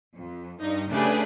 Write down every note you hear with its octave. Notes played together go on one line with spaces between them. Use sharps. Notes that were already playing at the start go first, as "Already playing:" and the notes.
F2
G2 D#4
C#3 A3 D4 G4 G#4 B4